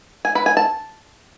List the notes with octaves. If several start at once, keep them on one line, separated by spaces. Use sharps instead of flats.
G#5
B4
G#5
A5